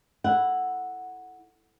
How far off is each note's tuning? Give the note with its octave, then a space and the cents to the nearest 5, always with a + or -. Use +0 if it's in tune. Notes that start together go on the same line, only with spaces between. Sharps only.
E4 +0 A4 +0 F#5 +0